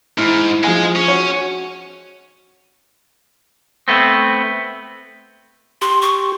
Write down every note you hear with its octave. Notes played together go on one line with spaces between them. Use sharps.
G#2 E4 F6
F3 G#3 G#4 G#5
C#4
F#4 C#5
A3 B3 C4
G4 C6
C#6